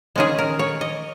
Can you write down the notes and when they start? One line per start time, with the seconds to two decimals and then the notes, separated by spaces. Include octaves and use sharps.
0.16 D#3 G#3 C#4 G#4
0.38 A#4
0.59 C#5
0.81 D#5